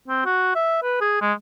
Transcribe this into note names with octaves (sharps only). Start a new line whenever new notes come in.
C4
F#4
E5
B4
G#4
G#3